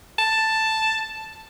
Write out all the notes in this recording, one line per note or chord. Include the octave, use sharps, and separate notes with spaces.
A5